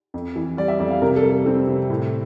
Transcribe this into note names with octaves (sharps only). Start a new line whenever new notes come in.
F2
E3
G3 D5
E5
F2 D5
F5
C3 A#4
A4
G3
A4
C4
C3
A2